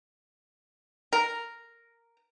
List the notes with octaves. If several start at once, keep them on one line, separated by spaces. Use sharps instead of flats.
A#4